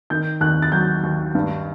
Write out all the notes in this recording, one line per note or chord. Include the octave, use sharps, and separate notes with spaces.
D#3 G6
D#2 F#6
A6
F#3 G6
D#2
G2